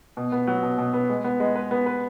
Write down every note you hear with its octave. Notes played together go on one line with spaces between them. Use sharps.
B2
B3
F#3
B2
B2
B3
G#3
B3
G#3
B4
B3
B4